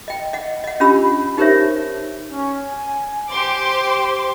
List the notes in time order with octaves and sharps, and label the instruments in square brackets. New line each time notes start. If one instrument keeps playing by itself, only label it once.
[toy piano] D#5 G5
D#5 F#5
D#5 F#5
C#4 D4 F4 G4 B5 E6
D#4 G4 A#4 C5 C#5 E5
[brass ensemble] C#4
G#5
[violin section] G4 C5 C6 D6